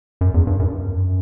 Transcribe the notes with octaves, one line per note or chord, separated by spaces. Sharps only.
F#2
E2
G2
F#2